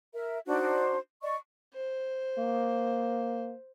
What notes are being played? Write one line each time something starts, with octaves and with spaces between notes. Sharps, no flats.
A#4 E5
D4 D#4 F#4 C5
D5 D#5 C#6
C5
A#3